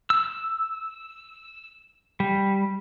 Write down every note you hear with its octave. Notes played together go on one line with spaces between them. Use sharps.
E6
G3